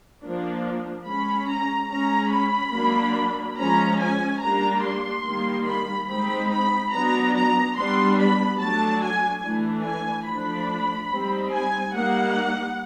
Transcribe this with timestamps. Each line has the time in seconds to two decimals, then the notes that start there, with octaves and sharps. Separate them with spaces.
0.23 F3 A#3 D4
1.06 G#3 C#4 B5
1.48 A#5
1.90 G#3 C#4 A#5
2.32 B5
2.74 F#3 A#3 D4
3.57 F3 G#3 C#4 A#5
4.00 G#5
4.41 G3 A#3 D4 A#5
4.84 C6
5.25 D#3 G3 A#3
5.66 B5
6.08 G#3 C4 D#4 B5
6.51 B5
6.93 F#3 B3 D4 A#5
7.34 A#5
7.76 G3 B3 D4 C6
8.18 B5
8.60 F#3 A3 D4 A5
9.02 G#5
9.43 E3 A3 D4
9.85 G#5
10.27 F3 A3 D4 B5
11.11 G3 C4 D#4
11.53 G#5
11.94 G3 A#3 D#4 F#5